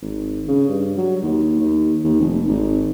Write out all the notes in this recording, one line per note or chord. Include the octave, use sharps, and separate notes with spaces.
G#1
C#3
G2
F#3
D#2
D#2
D#2
F1
G#1